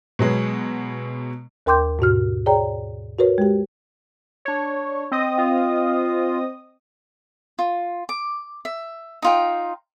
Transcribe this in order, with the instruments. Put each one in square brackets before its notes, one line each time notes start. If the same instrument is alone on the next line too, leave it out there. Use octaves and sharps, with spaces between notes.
[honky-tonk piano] B2 F#3 G#3 B3
[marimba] D#2 A#4 G5 C6 D6 G6
G#2 B2 F#4 F6
G#4 C#5 D5 G5 A#5
F#4 A#4 B4 C#5
G#3 G4
[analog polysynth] D4 C#5
C4 D#5 D#6
[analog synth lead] F4
[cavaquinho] F4
D6
E5
D#4 F4 G5